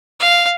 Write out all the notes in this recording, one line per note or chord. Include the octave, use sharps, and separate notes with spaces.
F5